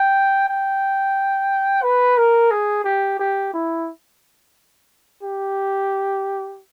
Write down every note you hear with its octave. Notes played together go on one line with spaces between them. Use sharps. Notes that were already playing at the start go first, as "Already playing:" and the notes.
Already playing: G5
G5
B4
A#4
G#4
G4
G4
E4
G4